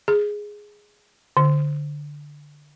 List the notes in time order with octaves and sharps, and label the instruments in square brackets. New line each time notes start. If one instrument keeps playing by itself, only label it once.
[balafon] G#4
D3